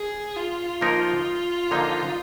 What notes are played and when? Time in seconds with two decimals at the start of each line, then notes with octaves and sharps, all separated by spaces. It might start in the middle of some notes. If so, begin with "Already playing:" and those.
Already playing: G#4
0.36 F4
0.81 F3 A#3 D#4 A#4
1.71 D3 F3 A#3 D#4